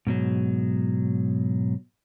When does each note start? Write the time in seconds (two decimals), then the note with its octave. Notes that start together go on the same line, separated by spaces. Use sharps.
0.07 G#2 B2 F#3